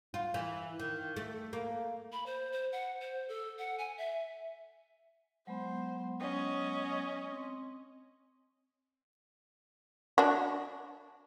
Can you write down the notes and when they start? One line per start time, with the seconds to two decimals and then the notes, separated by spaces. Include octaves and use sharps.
0.14 F4
0.34 E3
0.79 D#3
1.16 A3
1.53 A#3
2.12 B5
2.26 C5
2.52 C5
2.72 F#5
3.01 C5
3.29 A4
3.58 F#5
3.78 G#5
3.98 E5
5.47 F#3 G#3 B3 C5
6.20 C#4 D#5
7.32 C4
10.18 D4 F#4